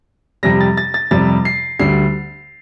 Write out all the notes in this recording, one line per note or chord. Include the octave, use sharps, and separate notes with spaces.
F2 C3 G3 A#6
A6
A6
A6
F2 C3 G3 A6
C7
D2 D3 G3 C7